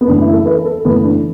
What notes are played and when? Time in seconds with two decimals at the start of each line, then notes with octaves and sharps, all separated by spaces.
0.01 B3
0.08 F#2 E3 A3 D4
0.21 E4
0.33 A4
0.46 B4
0.65 A4
0.85 F#2 E3 A3 B3
1.03 D4